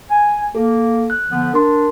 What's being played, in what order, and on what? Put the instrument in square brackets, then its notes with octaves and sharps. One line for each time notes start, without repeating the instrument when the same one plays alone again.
[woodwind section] G#5
[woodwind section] A#3 [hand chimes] A4
[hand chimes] F#6
[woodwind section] D3 F3 B3
[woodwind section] D4 [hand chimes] A#4 C6